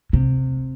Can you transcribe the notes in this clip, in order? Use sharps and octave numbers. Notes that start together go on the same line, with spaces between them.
C3